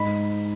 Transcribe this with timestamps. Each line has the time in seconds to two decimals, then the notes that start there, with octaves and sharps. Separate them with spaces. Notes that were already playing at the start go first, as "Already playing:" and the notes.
Already playing: G#2 B5